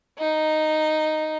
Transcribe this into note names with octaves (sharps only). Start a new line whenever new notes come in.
D#4